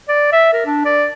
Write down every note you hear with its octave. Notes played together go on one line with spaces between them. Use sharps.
D5
E5
A#4
D4
D5